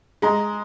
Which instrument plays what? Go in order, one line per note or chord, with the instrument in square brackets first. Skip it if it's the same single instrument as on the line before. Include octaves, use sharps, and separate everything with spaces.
[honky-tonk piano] G#3 [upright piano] A#5